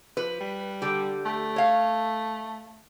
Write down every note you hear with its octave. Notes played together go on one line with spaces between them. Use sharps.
F3 B4
G3
D3 G4
A3
C#5 F5